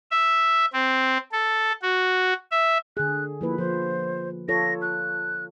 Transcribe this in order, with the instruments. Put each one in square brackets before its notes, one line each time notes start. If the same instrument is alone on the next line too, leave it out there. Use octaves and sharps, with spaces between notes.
[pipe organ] E5
C4
A4
F#4
E5
[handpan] D3 G#4 [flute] F#6
[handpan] F3 A#3 B4 [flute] E4
[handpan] F3 [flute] C5
[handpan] F4 A4 C#5 [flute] A#6
[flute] F#6